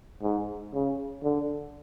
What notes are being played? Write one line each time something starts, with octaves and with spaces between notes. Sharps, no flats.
G#2
C#3
D3